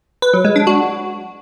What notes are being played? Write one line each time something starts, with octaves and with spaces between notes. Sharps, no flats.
B4
F#3
G#3
D4
F#4